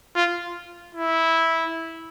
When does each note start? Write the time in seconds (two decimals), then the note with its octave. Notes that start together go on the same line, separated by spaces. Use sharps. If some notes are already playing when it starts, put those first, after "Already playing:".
0.16 F4
0.95 E4